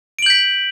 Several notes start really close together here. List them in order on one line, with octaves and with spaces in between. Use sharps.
D7 F#7 G6 B6